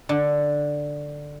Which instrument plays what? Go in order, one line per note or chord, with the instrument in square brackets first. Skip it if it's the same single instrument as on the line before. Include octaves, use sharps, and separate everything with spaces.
[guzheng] D3